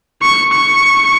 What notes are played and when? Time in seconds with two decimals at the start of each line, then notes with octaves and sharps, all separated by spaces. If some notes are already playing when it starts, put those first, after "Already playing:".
0.22 C#6
0.52 C#6